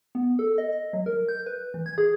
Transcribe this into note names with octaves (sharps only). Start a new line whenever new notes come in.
B3
A4
D#5
D#5
F#3
A#4
G6
B4
E3
G#6
G#4